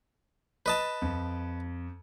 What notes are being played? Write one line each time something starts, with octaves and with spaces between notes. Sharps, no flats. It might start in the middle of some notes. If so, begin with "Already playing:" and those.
B4 D#5 A5
F2